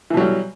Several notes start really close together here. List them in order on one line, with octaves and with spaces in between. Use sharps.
E3 B2 F#3 G3